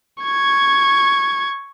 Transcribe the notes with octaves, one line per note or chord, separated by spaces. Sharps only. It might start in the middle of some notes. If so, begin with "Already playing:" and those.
C#6 G#6